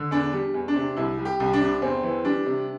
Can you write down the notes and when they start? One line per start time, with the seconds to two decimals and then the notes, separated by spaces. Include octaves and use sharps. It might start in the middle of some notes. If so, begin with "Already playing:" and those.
Already playing: D3
0.11 E2 D4
0.33 G3
0.54 E2
0.68 D4
0.75 C3
0.96 C2 E4
1.18 G3
1.25 G4
1.40 C2
1.53 D4
1.61 C3
1.82 E2 C4
2.03 E3
2.24 G3 D4
2.46 C3